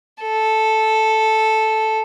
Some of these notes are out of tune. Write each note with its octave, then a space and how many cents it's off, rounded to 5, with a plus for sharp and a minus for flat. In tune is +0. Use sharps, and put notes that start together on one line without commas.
A4 -5